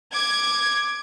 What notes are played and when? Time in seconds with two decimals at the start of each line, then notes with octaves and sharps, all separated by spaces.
0.13 D6 G#6